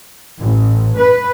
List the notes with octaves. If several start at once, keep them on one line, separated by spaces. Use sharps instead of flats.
A1
B4